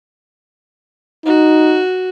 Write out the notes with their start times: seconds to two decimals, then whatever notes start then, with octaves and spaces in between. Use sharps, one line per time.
1.26 D#4 F#4